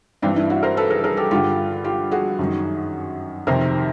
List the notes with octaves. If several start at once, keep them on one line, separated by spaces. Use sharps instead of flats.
G2 E3 C4 D4
D4 E4
E4 F#4
A#4 C5
A4 B4
G#4 A#4
G#4 A#4
G4 A4
G2 D3 F4 G4
F4 G4
F#4 G#4
F#2 D#3
F2 C3 D#3 A#4 C5